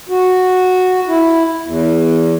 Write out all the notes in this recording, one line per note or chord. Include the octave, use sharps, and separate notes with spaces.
F#4
E4
E2